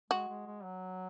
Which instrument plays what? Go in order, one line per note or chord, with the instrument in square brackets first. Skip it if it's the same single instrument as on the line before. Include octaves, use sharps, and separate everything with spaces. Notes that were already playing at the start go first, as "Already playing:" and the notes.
[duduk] G#3 [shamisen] F#4
[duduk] G#3
G#3
F#3